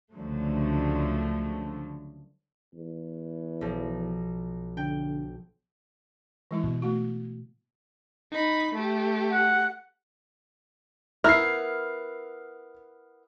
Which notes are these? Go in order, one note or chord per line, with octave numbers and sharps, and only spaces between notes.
C#2 D3 F3 F#3 A3
E2
B1 F3
D3 G5
E3 G#3 E4
B2
A3 F#4
D#4 B5
A3 G4
F#5
B3 E4 A#4 F6 C7